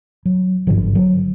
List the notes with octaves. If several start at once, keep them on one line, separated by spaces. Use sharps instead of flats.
F#3
G#1 G2 D3 F3
F#3